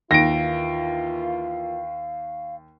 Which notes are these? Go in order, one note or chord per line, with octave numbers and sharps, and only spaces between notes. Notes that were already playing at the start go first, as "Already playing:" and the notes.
D#2 E3 A#3 F4 F5 A#6 D7